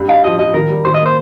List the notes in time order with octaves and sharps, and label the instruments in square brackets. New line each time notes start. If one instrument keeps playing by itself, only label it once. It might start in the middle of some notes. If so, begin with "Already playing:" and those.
Already playing: [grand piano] G2
[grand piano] D#4 [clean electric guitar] F5
[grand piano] F3 [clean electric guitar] D#5
[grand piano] F3 [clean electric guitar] D#5
[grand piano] D#3 [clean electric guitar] A#4
[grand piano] G3
[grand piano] D#3 [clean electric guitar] C5
[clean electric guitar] D#5
[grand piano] A#3
[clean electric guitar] C5